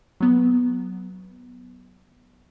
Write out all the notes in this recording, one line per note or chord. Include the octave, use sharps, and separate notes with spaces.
F#3 B3